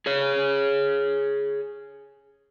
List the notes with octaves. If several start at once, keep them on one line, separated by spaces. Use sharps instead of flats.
G#4 C#5